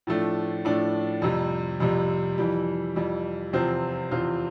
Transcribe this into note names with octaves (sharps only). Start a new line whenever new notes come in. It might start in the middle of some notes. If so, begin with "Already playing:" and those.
A2 F3 A3 D4
A2 F3 A3 D4
F2 C3 G3
F2 C3 G3
F2 E3 G3
F2 E3 G3
E2 C3 F3 C4 F4
E2 C3 F3 C4 F4